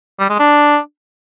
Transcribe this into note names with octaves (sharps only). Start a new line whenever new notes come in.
G3
G#3
D4